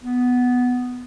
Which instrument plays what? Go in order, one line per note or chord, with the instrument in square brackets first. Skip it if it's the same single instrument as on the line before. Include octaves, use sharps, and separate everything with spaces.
[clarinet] B3